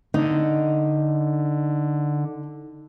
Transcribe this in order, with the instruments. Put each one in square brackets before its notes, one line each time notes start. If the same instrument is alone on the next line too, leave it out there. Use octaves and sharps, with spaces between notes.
[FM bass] D3 [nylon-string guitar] D#4